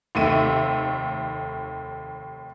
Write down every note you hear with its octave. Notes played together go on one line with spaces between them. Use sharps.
F1 D#2 A3 E5 D#7